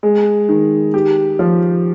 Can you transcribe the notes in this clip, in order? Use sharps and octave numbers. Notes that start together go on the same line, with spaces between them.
G#3
D#3
G4
F3